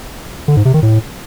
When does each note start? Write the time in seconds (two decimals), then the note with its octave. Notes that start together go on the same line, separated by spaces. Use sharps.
0.48 D3
0.57 G#2
0.65 C3
0.74 D#3
0.83 A2